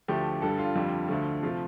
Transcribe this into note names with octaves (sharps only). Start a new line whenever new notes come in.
D2 D3 F3 A3 G4
G2 D3 G3 A4
F4
F2 D3 G3
D2 D3 F3 A3
C3 F3 A3 F4